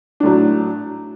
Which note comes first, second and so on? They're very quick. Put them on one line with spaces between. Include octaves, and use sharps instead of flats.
D4 A2 F#3